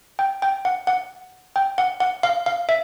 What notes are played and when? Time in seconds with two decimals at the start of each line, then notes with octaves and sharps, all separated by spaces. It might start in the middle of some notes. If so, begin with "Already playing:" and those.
0.19 G5
0.42 G5
0.65 F#5
0.87 F#5
1.56 G5
1.78 F#5
2.00 F#5
2.23 F5
2.46 F5
2.69 E5